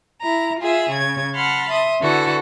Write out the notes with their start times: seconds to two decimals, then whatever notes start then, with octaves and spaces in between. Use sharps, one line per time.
0.21 E4 A#5
0.59 F4 G#4 E5
0.90 C#3 G#6
1.34 F#5 A5 B5 C6 F6
1.69 E5 C6 D#6
2.01 D3 E3 F#4 A4